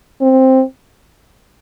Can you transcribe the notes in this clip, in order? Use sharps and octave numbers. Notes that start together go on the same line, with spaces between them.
C4